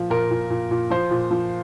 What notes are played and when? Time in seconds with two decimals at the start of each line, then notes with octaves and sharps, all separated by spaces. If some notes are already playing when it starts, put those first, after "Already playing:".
Already playing: A#2 F3
0.10 A#2 A#4
0.31 A#2
0.50 A#2
0.71 A#2
0.90 F3 C5
1.11 A#2
1.31 F3